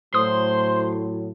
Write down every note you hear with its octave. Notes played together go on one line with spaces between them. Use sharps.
A2 F#3 C5 C6 D#6